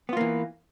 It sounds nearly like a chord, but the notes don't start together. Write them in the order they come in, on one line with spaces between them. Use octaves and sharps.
B3 F4 A#3 E3